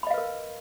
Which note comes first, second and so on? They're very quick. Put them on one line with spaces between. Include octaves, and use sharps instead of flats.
B5 D#5 F5 B4 A#4